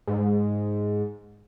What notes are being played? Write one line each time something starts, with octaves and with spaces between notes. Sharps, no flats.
G#2